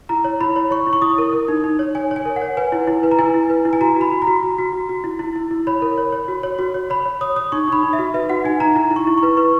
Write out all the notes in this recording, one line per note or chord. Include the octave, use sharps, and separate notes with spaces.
E4 A#5
C#5
E4 B5
C#5
C#5 C#6
E4
C#6
E4 D#6
A#4
A#4
D#4
D#4
C#5
C#5 G#5
C#5
G#5
A#4
F#5
C#5
B4 G#5
E4
E4
B4
A#5
E4 G#5
E4
B4
E4
G#5
F#4 A#5
F#4 B5
F#4
A#5
F#4
F#4
F#4
F#4
F#4
E4
E4
E4
E4
C#5 B5
A#4
C#5
C#5
F#4
C#5
F#4
C#5
C#5 B5
C#5
C#5 D#6
C#5 D#6
D#4 C#6
D#4 B5
D#4
E5
F#4
B4 E5
F#4 F#5
D#4 G#5
D#4 A#5
E4 A#5
E4
C#6
E4
C#6
B4
B4 C#6